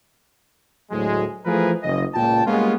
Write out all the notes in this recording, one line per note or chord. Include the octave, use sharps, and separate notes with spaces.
D2 A2 F#3 G#3
E3 F3 A3 G#4 A#4 B4
F#1 D#5
C#2 A#2 F4 G5 A5
G3 G#3 A#3 B3 C#4 F4